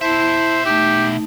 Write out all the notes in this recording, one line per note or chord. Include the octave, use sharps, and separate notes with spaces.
B2 E4 C5 E5 A5
A3 D#4 G4